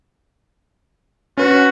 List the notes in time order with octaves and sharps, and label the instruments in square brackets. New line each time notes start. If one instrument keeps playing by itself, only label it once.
[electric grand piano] C#4 B4 [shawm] F#4